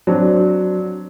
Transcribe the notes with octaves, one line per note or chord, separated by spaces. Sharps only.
F#3 C4 D4